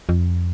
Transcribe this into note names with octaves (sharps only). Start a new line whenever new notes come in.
F2